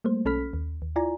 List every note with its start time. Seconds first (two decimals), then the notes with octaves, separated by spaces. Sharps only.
0.04 G3 A3 A#3 C5
0.25 B1 C#4 A4 B5 F6 B6
0.53 D#2
0.82 D#2
0.96 E4 F4 D5 G#5 A#5